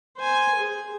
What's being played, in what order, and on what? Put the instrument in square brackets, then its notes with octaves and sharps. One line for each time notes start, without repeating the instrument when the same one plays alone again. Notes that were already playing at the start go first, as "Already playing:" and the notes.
[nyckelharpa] C5 G#5
G#4